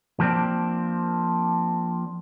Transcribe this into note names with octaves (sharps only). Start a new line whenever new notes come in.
F3 A#3 C4 D4